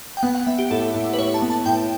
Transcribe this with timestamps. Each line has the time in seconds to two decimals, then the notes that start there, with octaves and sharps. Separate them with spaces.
0.17 G5
0.23 B3 F#5
0.35 F#5
0.47 B3 E5
0.59 G4
0.70 A2 A4
0.94 A2
1.14 B4
1.18 A2 C#5
1.34 A5
1.42 B3
1.50 A5
1.66 A2 G5